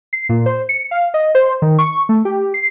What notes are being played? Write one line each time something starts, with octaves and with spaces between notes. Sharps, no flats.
C7
A#2
C5
C#7
F5
D#5
C5
D#3
C#6
A3
G4
C7